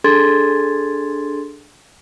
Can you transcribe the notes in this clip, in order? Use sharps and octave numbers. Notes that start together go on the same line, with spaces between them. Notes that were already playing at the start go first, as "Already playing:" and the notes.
D4 G#4 A4 C6 G#6 A6